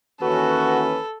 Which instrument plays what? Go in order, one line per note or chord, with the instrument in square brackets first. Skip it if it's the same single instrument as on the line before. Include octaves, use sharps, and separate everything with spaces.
[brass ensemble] D#2 E3 C#4 [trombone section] F#4 [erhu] A4 [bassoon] B4